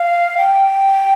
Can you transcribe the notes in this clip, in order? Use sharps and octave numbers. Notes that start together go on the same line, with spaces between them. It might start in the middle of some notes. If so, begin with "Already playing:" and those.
Already playing: F5
G5